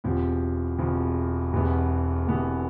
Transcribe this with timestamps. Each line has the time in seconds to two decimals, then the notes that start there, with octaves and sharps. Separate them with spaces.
0.04 E1 E2 C3 F3
0.78 E1 E2 C3 F3
1.53 E1 E2 C3 E3 B3
2.26 E1 E2 C3 E3 B3